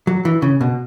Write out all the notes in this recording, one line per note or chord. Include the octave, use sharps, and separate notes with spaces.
F#3
E3
C#3
B2